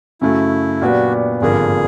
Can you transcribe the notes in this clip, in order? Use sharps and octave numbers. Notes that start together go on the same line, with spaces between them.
F#2 C#3 F#3 A3 E4
A#2 F#3 B3 D4 F#4 G4
G#1 G2 D3 F3 A#3 G#4